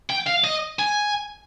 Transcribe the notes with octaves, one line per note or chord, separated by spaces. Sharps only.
G5
F5
D#5
G#5